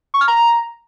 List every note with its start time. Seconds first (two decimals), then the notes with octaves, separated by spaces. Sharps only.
0.14 C#6
0.21 F6
0.28 A#5